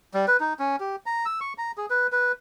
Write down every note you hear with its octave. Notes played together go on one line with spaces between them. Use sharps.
G3
B4
D#4
C#4
G4
A#5
E6
C#6
A#5
G#4
B4
B4